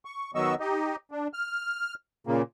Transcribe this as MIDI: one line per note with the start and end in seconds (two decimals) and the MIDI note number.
0.05 0.31 85
0.35 0.55 51
0.35 0.55 54
0.35 0.55 59
0.35 0.55 75
0.35 0.55 85
0.35 0.55 88
0.60 0.96 63
0.60 0.96 67
0.60 0.96 75
1.11 1.27 62
1.33 1.94 89
2.27 2.42 46
2.27 2.42 49
2.27 2.42 58